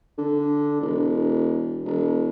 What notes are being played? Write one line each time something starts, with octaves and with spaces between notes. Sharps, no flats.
D3
E1
E1